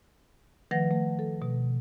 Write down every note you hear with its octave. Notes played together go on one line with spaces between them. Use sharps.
D#3 F3 A3 B4 F#5 A#6
A3
A4
B2